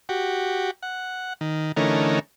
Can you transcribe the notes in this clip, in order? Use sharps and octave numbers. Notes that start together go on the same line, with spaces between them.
F#4 G4
F#5
D#3
D3 E3 A3 C#4 D#4 A#4